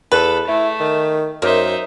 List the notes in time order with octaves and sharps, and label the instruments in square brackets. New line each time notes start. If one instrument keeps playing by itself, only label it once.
[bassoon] E2 [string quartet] A4 [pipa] B4
[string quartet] A3 [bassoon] E4
[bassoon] D#3
[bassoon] F#2 [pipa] A#3 [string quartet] D#4 C5 E5